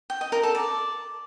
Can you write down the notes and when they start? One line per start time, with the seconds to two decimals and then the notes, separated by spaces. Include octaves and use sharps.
0.10 G5
0.21 D#5
0.32 A#4
0.43 A4
0.55 D5